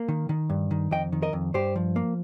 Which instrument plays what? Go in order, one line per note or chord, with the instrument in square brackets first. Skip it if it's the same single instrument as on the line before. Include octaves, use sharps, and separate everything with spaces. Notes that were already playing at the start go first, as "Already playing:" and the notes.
Already playing: [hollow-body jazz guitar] A#3
D#3
D#3
G2
D#3
F2 D#5 G5
D#3
A#4 D#5
F2
G2 G4 C5
F3
A#3